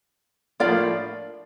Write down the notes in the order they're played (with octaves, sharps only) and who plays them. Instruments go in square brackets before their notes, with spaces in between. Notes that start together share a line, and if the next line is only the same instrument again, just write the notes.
[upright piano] A2 F3 A#3 D4 F4 [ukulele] D5 F5